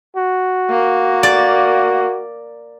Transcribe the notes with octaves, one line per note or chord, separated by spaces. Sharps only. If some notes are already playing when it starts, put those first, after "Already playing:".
F#4
A#3
D5